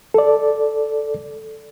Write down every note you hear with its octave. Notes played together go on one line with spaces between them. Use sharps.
A4 D5